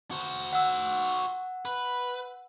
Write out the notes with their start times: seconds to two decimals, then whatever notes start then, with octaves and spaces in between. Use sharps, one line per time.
0.11 F#4 C5
0.53 F#5 E6
1.65 B4